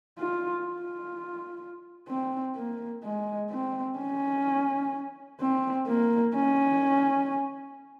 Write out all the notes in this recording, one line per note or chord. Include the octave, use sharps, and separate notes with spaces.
F4
F4
C4
A#3
G#3
C4
C#4
C4
A#3
C#4